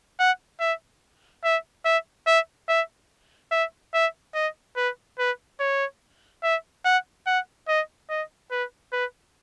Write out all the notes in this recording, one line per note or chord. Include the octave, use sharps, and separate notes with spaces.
F#5
E5
E5
E5
E5
E5
E5
E5
D#5
B4
B4
C#5
E5
F#5
F#5
D#5
D#5
B4
B4